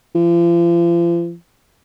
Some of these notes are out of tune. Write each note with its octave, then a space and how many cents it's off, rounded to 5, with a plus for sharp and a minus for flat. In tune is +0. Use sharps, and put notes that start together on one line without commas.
F3 -40